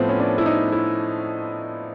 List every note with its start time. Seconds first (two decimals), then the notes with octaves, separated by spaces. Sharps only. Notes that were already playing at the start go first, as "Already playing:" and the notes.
Already playing: A2 F3 B3 C4
0.09 C#4
0.20 D4
0.38 E4
0.46 D#4
0.72 E4